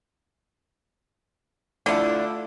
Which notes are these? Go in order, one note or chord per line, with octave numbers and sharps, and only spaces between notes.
D3 A3 D4 E4 F4